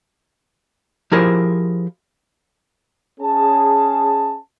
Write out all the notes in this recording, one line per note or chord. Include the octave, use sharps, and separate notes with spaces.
F3 E4 G4 G#4 A#4 C5
C#4 G#4 A5